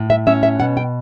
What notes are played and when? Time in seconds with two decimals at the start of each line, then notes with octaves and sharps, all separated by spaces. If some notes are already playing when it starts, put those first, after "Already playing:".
Already playing: A2
0.10 E5
0.27 C#4 E5
0.43 E5
0.60 B2 F#5
0.77 G5